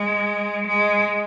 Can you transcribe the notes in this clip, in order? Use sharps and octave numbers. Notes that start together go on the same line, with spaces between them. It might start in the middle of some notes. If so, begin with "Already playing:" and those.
Already playing: G#3
G#3